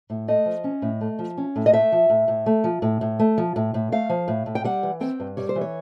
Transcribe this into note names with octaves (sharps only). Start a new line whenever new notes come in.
A2
A3 D#5
F3
C#4
A2
A3
F3
C#4
A2
D#5
A3 E5
F3
A2
A2
A3
F3
A2
A2
A3
F3
A2
A2
A3 F5
F3
A2
A2
G5
G3 F#5
E3
C4 G5
G2
G3 C#5
C5
E3
C#5